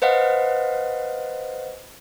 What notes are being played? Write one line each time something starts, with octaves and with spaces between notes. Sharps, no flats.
B4 C5 D#5 F5 F#5